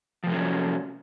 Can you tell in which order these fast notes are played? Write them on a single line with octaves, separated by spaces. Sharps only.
F3 C3 A3 C#4 F#3